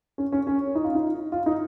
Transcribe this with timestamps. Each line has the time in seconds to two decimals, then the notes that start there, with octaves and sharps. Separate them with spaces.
0.18 C#4
0.32 C#4
0.47 C#4
0.75 D#4
0.84 F4
0.95 D#4
1.32 F4
1.46 D#4